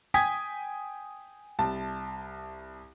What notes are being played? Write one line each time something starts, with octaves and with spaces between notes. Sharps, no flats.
G5 G#5 D#6 G#6 B6
C2 A5